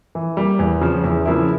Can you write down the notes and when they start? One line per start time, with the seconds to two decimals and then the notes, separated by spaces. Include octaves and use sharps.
0.15 E3
0.37 G3 A#3
0.59 E2
0.81 C#3 F3 C#4
1.04 E2
1.26 C#3 F3 A#3 E4